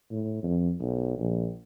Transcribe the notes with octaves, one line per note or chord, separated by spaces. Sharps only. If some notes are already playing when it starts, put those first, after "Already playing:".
A2
F2
B1
A#1